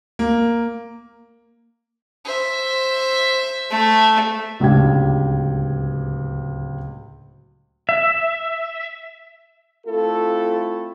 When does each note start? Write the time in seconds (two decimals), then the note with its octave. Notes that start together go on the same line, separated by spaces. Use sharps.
0.19 A#3
2.25 C5 E5
3.71 A3
4.60 D1 C#2 D4 G4 G#6
7.89 E5
9.86 A3 C4 E4 F4 A4